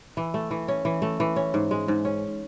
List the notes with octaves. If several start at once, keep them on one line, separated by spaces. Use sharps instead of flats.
E3
A3
E3
C#4
E3
A3
E3
C#4
G#2
G#3
G#2
C#4